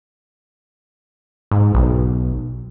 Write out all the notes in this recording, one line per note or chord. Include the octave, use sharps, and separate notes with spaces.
G#2
B1